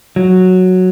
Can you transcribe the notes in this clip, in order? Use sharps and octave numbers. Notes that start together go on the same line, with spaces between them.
F#3